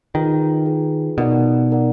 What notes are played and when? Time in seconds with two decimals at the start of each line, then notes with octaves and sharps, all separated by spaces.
0.14 D#3 F4 G#4 B4
0.66 F4 G#4 B4
1.18 B2 D#4 A#4 D5 F#5
1.70 D#4 A#4 D5 F#5